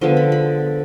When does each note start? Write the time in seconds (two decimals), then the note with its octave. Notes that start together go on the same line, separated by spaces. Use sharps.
0.01 D3 F3 G#3 B3 C6
0.17 B5
0.32 B5